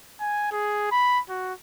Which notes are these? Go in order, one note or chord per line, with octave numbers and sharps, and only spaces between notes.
G#5
G#4
B5
F#4